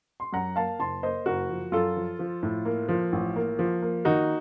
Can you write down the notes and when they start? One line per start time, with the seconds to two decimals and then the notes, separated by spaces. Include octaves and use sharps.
0.20 C6
0.33 F#2 F#5 A#5
0.56 A#3 F5 A5
0.79 F#1 A5 C6
1.03 A#3 C5 D#5
1.26 F#1 F#4 A#4
1.50 F3
1.72 F#2 F4 A4
1.97 F3
2.19 F3
2.43 A2
2.65 A#3
2.89 F3
3.12 A1
3.36 A#3
3.59 F3
3.82 A#3
4.05 D#3 D#4 F#4